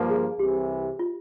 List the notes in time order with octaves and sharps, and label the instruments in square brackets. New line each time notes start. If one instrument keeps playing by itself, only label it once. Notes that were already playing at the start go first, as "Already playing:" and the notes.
Already playing: [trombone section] G2 F3 A#3
[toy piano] G#4
[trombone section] C2 C3 E3 [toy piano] G4
[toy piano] F4